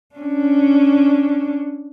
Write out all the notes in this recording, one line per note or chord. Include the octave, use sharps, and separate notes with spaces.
C#4 D4